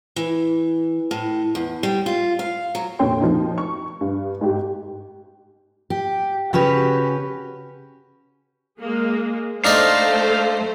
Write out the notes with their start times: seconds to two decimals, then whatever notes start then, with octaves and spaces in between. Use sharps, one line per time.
0.16 E3
1.11 A2
1.55 E2
1.83 G3
2.06 F4
2.39 F5
2.75 F#3
2.99 F2 A#2 D3 C#5 G5 C6
3.21 F3 D#4
3.58 C#6
4.01 G2
4.41 G#2 G4
5.90 G4
6.53 C#3 C#4 F#4 G4 B4
8.79 G#3 A#3
9.65 A3 D4 D#4 C5 D5 F5